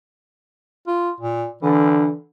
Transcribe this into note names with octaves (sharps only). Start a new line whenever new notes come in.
F4
A#2
D3 E3